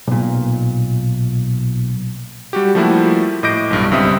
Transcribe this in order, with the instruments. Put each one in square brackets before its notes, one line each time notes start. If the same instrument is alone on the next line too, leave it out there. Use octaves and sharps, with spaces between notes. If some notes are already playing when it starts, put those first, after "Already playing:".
[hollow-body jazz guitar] B1 A#2
[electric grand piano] G3 F#4 G4
F3 G3 A3 A#3 E4 F#4
A2 D#5 D6 G6 A#6 D7
B1 G2
C#2 G3 C4 E5 D#6